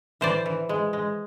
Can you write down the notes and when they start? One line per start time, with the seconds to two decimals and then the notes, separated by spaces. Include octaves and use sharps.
0.21 E3 C5 D5
0.46 E3
0.69 G#3
0.93 G#3